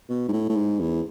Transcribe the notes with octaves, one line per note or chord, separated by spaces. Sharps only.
B2
G#2
A2
A2
G#2
E2